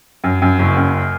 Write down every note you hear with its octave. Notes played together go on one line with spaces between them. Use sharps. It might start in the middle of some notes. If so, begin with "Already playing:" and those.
F#2
F#2
F#1
F#2